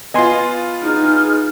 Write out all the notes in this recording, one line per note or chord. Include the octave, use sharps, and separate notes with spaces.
B3 F4 D#5 G#5 C6
D#4 G#4 F6